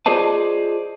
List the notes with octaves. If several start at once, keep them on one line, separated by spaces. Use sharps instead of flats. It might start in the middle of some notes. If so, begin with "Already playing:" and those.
F4 G#4 C5 D5 D#5 A5